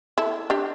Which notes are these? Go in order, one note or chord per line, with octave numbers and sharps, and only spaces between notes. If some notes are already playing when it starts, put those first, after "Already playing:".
E4 A4
D4 G4